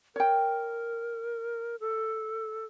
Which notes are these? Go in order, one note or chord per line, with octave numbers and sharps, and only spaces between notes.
A#4 C#5 G5
A4